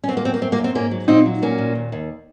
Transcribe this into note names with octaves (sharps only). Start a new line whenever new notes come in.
C#4
F#2 C4
A#3
F#2 C4
A#3
F#2 C4
A#3
F#2
C4
G#2 A#3 C#4
F#3
A#2 C4 D#4
F#3
A#2 A#3 C#4
A#2
D#2
D#2